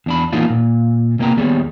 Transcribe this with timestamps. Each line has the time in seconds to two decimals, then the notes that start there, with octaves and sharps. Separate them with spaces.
0.06 E2 D4 B5
0.33 E3 A#3 B3 D4 D#4 F4
0.50 A#2
1.19 C3 A#3 B3 G5 A#5
1.37 D#2 G3 B3 G#4 C#5